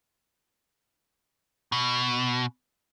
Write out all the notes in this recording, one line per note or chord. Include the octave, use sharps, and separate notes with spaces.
B2